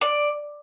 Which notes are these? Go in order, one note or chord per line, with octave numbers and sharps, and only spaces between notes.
D5